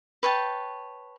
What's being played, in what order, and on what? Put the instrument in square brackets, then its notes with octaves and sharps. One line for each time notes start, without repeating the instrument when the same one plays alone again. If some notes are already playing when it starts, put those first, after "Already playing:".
[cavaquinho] B4 C#5 G5 A5